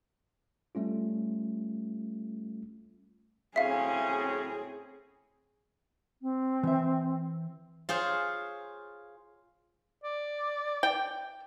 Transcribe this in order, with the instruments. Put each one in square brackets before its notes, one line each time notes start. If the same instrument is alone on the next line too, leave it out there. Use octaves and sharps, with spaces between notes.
[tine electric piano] G3 A3 C#4 F4
[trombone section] A2 F#3 C#4 [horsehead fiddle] C4 G#4 [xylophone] E5 F5
[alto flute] C4
[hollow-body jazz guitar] E3 E5
[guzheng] F4 G#4 C5 C#5
[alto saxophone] D5
[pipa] G5